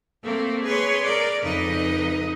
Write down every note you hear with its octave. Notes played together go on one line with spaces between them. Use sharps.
A3 A#3 C4
G#4 B4 C#5 C6
A#4 D5
F2 C#3 D#4 B4 D#5